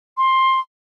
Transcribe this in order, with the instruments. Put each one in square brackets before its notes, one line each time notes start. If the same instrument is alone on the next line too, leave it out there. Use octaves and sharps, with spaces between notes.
[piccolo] C6